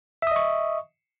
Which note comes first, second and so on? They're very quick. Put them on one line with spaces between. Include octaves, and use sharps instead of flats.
E5 D#6 D#5 C#6